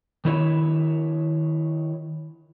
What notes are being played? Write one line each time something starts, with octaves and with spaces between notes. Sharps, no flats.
D#3 E4 C#5